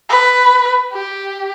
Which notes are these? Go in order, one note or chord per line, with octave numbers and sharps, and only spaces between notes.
B4
G4